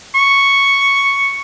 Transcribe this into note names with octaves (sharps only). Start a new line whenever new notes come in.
C#6